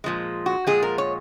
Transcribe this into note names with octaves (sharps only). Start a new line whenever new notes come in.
A#2 F3 G#3
F#4
A#2 F3 G#3 G#4
A#4
C#5